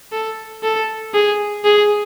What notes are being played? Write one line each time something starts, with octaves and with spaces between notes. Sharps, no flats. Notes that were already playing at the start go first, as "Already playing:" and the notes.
A4
A4
G#4
G#4